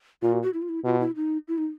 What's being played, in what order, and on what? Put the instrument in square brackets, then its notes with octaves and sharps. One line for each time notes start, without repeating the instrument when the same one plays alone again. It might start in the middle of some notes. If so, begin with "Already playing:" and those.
[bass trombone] A#2 [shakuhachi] F4
[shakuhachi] F#4
F#4
E4
F4
E4
[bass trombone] B2 [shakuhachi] F4
[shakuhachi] E4
D#4
E4
D#4